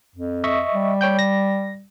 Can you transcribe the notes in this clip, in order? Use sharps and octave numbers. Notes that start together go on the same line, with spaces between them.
F2
D#5 E5 C#6
G3
C#5 G5 G6
A#6